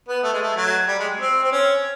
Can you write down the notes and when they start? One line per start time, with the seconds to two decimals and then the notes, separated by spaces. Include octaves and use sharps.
0.08 B3
0.24 A3
0.33 G#3
0.42 A3
0.57 F#3
0.88 G3
0.99 G#3
1.20 C4
1.43 C4
1.52 C#4